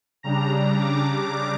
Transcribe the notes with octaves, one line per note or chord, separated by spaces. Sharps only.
C#3 G3 D4 A#5
A#5
D6
A#5